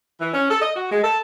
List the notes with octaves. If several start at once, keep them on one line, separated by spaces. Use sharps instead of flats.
E3
C#4
A4
D#5
F#4
G#3
A4